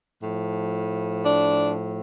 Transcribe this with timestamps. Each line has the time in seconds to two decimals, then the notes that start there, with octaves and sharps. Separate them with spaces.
0.22 A2 F3
1.25 D4